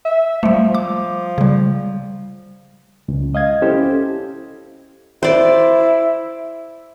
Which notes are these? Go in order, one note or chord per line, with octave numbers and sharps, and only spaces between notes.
E5
F3 G3 A3
D6
C#3 G3
C#2
D#5 F5 G#6
C#4 E4 G4 A4 C5
E4 C5 D5